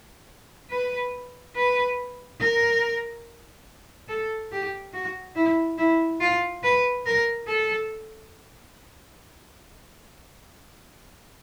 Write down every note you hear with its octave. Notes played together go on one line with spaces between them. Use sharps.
B4
B4
A#4
A4
G4
F#4
E4
E4
F4
B4
A#4
A4